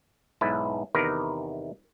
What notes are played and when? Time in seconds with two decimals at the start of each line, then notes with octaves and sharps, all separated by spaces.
0.41 B1 G#2 E4 B4 A5
0.95 E2 C3 D#3 A#4 B4